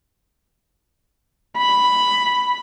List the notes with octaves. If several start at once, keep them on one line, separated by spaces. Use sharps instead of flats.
B5